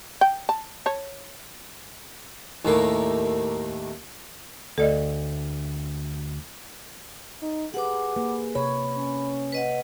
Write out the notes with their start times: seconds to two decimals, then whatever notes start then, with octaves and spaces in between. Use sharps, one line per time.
0.21 G5
0.49 A5
0.86 C#5 A5
2.65 D#2 A2 A#3
4.78 D2 A4 D5 D#5
7.42 D#4
7.74 G4 G#4 B4 F#5 D6
8.16 A#3 B4
8.55 C3 C#5 B5
8.98 C#4
9.52 B4 D#5 F#5